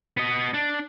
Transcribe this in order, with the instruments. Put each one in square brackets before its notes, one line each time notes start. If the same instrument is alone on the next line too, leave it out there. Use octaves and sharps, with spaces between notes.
[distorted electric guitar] B3 D#5
D4